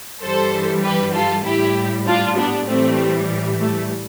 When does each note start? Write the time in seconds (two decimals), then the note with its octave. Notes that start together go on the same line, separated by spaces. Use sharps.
0.21 G2 E3 G3 A4 C5
0.83 G4 B4
1.13 F4 A4
1.44 A2 G3 E4 G4
2.06 D4 F4
2.37 B3 D4
2.67 A2 E3 G3 A3 C4
3.60 A3